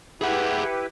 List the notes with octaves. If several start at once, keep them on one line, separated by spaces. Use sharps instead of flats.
E4 G4 G#4 B4 F#5